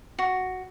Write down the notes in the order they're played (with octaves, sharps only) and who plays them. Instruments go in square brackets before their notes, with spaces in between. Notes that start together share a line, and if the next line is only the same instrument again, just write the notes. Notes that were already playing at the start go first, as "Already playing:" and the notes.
[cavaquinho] F#4